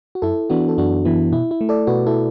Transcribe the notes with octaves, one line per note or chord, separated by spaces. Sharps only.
F#4
F#2 E4 A4
E3 B3 D4 F#4
A4
F#2 D4 F#4
E3 B3 E4
B2 E4
E4
A3
A4 D5
B2 F#4 B4
E4 A4